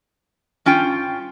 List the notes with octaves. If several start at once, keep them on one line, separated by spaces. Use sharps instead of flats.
G2 C#4 F4 G5